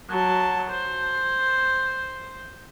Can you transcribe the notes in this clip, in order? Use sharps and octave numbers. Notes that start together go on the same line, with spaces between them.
F#3 A5
C5